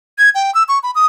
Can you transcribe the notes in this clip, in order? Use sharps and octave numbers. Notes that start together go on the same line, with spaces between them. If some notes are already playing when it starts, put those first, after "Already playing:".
G#6
G5
E6
C#6
B5
D#6